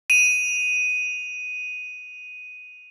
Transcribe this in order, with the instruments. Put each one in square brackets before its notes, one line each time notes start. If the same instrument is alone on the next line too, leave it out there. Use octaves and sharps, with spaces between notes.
[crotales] D#7 F7